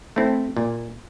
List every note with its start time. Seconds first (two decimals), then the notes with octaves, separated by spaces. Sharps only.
0.16 A3 C4 E4
0.57 A#2